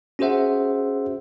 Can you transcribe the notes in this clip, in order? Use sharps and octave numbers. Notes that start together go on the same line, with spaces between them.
C#4 F#4 G#4 C5 E5 F#5